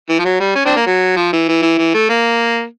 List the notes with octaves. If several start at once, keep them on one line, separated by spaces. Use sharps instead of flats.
E3
F3
F#3
G3
C#4
C4 D4
A#3
F#3
F3
E3
E3
E3
E3
A3
A#3